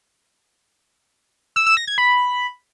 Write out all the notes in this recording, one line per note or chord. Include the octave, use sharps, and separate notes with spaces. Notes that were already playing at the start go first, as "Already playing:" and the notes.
E6
E6
A#6
G#6
B5